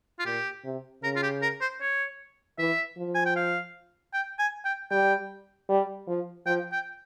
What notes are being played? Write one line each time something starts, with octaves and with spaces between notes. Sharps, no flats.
F4
A#2 G4
C3
C#3 A#4
F4
G4
A#4
C5
C#5
E3 E5
F3
G#5
G5
F5
G5
G#5
G5
G3 G5
G3
F3
F3 G5
G5